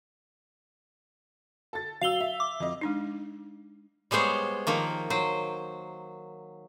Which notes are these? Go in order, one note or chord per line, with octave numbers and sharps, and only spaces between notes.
A4 A6
F#3 F5 E6 F7 G7
E5
D6
F2 D#5
G#3 D4 D#4
G3 G#3 B3 C5 C#5
D#3 F3 A#3
F#3 C5